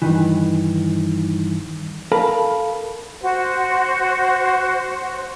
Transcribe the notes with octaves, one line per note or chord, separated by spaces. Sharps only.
G2 D#3 E3
A4 A#4 F5 A5 B5
F#4 C5